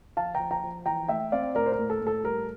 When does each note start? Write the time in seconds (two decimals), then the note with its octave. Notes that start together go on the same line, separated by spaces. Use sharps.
0.17 F3 F5 A5
0.35 F3 G5 A#5
0.51 G5 A#5
0.63 F3
0.86 E3 G5 A#5
1.08 A3 E5 G5
1.32 C4 D5 F5
1.55 A2 A#4 D5
1.66 C5
1.72 A#4
1.79 A2
1.90 A4
2.01 A2
2.07 A4
2.24 G3 A#4